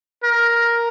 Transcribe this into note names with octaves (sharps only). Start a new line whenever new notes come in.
A#4